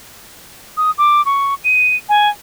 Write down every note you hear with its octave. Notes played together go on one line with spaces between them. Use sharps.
D#6
D6
C#6
D#7
G#5